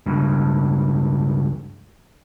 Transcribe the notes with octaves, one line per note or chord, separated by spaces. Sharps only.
C#2 G2